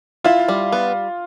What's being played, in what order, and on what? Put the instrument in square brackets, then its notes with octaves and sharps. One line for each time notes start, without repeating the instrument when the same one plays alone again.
[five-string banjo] E4 [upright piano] F4
[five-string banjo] G3
B3